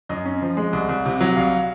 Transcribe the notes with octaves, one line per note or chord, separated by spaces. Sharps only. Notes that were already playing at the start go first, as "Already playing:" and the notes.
F#2 D#5
C#4
F3
G#3
C2
C2
C3
F#3
C2 F5